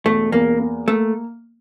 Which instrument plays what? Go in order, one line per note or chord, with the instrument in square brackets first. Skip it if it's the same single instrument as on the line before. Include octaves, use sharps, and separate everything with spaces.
[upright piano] E1 [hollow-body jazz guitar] A3
[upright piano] E2 [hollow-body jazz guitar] A#3
[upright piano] A#3
[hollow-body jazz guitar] A3 [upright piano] A#3